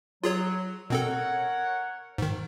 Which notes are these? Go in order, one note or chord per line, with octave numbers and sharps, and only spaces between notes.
F#3 F4 G#4 C#5
B2 C4 A4 A#4 C#5 F#5
G#2 D#3